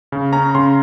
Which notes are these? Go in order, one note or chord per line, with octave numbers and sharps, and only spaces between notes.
C#3
C#4 A#5
C#3 C6